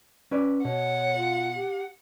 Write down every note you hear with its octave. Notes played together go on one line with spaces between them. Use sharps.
C#4 B4 D5
B2 C#5 F#5
F4
G4